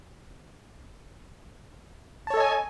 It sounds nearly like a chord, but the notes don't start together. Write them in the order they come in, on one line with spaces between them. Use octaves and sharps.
A5 C#5 A4 D#5 G#5